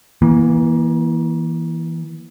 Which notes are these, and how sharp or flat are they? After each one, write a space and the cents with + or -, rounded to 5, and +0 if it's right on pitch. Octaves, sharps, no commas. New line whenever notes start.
E3 -10 A#3 +30